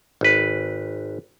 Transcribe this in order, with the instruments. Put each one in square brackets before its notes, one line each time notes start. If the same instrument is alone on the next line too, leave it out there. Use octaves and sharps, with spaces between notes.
[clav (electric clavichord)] G#1 B4